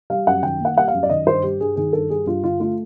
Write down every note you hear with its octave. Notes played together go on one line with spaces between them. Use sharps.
G3 F5
F#2 F#5
D#3 G5
A#3
F#5
G3 F#5
F5
F#2
D5
D#3 D#5
G2 C5
G3 G4
G2 G#4
D#3 G#4
G2 A4
G3 G#4
G2 F4
D3 F4
A3 F4